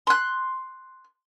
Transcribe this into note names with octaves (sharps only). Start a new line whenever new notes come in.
C6 F#6